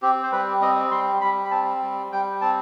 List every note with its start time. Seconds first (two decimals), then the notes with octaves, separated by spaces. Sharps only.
0.02 C4 G4
0.23 C5
0.32 G3 B4
0.62 C4 D#5
0.91 G3 C6
1.21 G3 B5
1.45 B5
1.51 C4 A5
1.82 G3
2.12 G3 G5
2.41 C4 A5